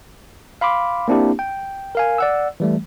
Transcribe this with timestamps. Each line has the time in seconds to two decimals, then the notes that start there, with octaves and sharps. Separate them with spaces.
0.61 F5 B5 C6 D6
1.08 A#3 C4 D4 E4 G4
1.39 G5
1.95 A#4 F5 G#5
2.18 D5 F#5 E6
2.60 E3 G3 A3